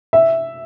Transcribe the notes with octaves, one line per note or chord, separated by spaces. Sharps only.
E5